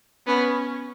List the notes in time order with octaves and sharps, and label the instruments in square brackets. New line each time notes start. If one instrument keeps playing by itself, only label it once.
[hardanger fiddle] B3 [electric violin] C#4